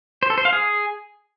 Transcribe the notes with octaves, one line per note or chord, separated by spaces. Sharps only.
C5
A4
C5
F5
G#4